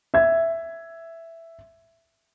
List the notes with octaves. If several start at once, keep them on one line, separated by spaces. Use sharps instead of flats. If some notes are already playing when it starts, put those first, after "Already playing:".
E5 G#6